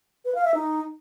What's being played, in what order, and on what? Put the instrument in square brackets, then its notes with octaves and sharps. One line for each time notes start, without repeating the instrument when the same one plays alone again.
[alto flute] B4
F5
E5
D#4